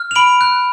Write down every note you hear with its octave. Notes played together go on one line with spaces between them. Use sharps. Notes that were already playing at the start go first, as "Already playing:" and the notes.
Already playing: F6
F7
B5 D7 F#7
F#6